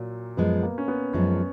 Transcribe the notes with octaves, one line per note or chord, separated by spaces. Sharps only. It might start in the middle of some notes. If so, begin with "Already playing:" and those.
Already playing: A#2 F#3
F#2 F3 G#3 B3
A#3
C#4
B3
F#2 F3 G#3 C#4